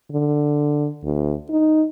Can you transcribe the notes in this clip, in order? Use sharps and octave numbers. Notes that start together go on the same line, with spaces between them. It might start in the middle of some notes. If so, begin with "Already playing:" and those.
D3
D2
D#4